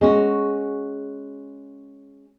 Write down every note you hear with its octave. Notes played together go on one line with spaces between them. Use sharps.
G#3 C#4 F#4